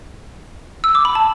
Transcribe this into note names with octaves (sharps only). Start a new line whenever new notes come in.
E6
D6
B5
A5